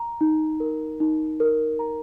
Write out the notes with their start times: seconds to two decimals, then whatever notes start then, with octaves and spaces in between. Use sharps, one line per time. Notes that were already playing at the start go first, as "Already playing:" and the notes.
Already playing: A#5
0.21 D#4
0.60 A#4
1.00 D#4
1.40 A#4
1.79 A#5